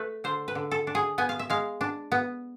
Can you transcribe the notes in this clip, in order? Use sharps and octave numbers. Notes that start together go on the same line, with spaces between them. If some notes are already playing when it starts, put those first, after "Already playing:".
Already playing: A3 B4
D3 C5
B4
D3
A4
D4
G#4
B3 G#5
F5
E5
G#3 F5
D4
B3